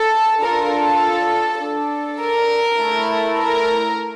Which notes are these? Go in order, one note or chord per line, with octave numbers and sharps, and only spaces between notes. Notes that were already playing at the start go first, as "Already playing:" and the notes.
Already playing: A4
D4 F4 A4 A#4
A4
D4 A4
A#4
A3 E4 A4
A#4